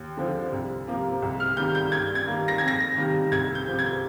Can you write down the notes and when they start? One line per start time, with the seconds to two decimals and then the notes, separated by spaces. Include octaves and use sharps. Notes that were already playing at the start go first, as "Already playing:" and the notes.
Already playing: D#2
0.17 D3 F3 C4
0.52 C2
0.87 C3 F3 A#3
1.22 C2
1.40 F6
1.57 C3 D#3 G3 A#3 G6
1.75 G6
1.92 G2 G#6
2.15 G#6
2.27 D#3 G3 A#3
2.48 A#6
2.58 F2 G#6
2.68 A#6
2.97 C3 D#3 G3 A#3
3.32 C2 G#6
3.55 G6
3.67 C3 F3
3.79 G#6